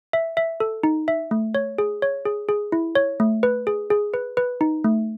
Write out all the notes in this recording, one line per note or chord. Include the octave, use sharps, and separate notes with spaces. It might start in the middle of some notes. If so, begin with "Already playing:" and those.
E5
E5
A4
D#4
E5
A3
C#5
G#4
C#5
G#4
G#4
E4
C#5
A3
B4
G#4
G#4
B4
B4
D#4
A3